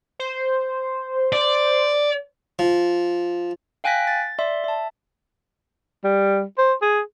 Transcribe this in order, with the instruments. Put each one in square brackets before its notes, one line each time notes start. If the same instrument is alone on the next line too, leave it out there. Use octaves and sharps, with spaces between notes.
[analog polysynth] C5
[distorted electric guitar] D5
[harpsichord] F3
[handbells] F5 G5 G#5 F#6 A#6 B6
A6
D5 E5 C6
E5 A5
[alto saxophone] G3
C5
G#4